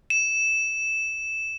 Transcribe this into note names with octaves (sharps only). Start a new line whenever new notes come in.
E7